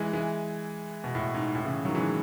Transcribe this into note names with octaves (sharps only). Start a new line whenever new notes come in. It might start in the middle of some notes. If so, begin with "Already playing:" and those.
Already playing: E3 G#3
E3 G#3
B2
A2
G#2
A2
C#3 E3
D#3 F#3
E3 G#3